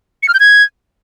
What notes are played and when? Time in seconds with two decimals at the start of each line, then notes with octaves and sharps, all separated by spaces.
0.23 C#7
0.28 F6
0.34 G6
0.40 G#6